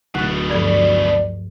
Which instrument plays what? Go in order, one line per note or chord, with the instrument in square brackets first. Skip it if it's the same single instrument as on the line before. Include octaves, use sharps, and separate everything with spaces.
[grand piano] D1 [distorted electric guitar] B2 A3 [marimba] F#5 F#6
[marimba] G2 F3 A4 [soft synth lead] D5